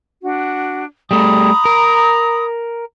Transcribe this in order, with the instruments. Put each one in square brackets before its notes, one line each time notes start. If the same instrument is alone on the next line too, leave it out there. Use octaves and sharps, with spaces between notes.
[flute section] D4 F#4
[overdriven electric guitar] G3 A3 [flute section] A#5 B5 D#6
[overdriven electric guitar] A#4